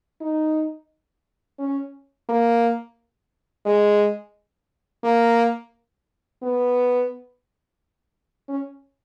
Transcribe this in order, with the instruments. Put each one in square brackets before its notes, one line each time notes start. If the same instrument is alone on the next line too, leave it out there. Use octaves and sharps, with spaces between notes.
[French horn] D#4
C#4
A#3
G#3
A#3
B3
C#4